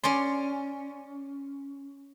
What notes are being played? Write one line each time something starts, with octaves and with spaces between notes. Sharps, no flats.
C#4 D5 C6